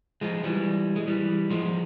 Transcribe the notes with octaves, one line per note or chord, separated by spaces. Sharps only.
F3 G#3
E3 G3
G#3
E3 G3
F3 G#3